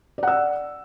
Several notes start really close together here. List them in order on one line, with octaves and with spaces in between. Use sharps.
D5 F#5 E6